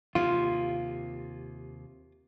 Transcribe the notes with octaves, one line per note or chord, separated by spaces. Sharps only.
D#2 C3 F4